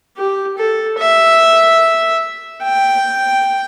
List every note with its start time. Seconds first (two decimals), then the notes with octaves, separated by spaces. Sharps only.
0.17 G4
0.58 A4
0.98 E5
2.62 G5